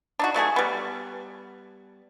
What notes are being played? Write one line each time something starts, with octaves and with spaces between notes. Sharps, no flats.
D4 D#4 F#4
F#3 A3 F#4 G#4
G3 B3